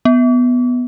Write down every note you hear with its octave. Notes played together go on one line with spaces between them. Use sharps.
B3